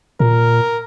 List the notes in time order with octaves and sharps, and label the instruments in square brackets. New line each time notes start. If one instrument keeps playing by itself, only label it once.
[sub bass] A#2 [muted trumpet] A#4